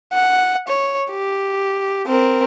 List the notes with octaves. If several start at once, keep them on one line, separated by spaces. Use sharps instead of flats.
F#5
C#5
G4
C4 A#4